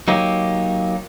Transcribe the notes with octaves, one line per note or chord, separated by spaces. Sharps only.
F#3 A#3 D#4 G4